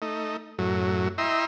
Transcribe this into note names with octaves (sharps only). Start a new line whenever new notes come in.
A3 D#4
F#2 A2 F#3
E4 D#5 E5 G5 A#5 C6